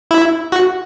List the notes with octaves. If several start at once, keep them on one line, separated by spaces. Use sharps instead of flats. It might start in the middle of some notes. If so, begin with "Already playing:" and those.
E4
F#4